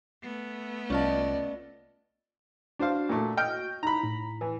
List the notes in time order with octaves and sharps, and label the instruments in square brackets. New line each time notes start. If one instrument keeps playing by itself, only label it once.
[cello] A3 B3
[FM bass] C2 [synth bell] C#4 F4 A5 [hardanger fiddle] D5 D#5
[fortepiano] D4 C5 F5 [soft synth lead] F#4
[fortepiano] A#2 A3
D#5 G5 F6
[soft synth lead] D#4 [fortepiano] A#5 B5
[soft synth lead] A2
[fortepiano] E3